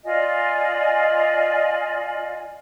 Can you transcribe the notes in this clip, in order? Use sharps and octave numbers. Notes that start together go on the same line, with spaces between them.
F4 D5 D#5 G#5